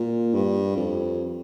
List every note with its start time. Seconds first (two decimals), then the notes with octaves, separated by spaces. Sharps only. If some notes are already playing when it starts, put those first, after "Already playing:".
Already playing: A#2
0.34 G2
0.77 F2